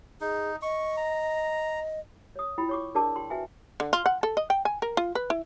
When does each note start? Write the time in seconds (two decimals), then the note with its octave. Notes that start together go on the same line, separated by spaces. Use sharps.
0.21 D#4 G#4
0.62 D#5 C#6
0.97 A#5
2.36 C#5 D#6
2.58 E4 F4 G5 B5
2.69 C#5 C#6 D6
2.95 D4 G#4 A#4 D5 A5 D6
3.16 G5 C6
3.30 F#4 B4 E5 G5 G#5
3.80 D3
3.93 F4
4.06 F#5
4.23 A4
4.37 D#5
4.50 G5
4.65 G#5
4.82 A#4
4.97 F4
5.15 B4
5.30 E4